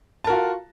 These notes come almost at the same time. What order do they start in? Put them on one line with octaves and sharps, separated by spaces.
A5 A#4 F#4 F4